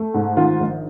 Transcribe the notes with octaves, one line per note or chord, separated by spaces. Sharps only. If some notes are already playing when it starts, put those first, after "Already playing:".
Already playing: A3
G#2
D#3 F4
A#1